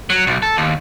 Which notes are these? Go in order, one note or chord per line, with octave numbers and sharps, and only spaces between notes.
F#3
B1
A4
D#2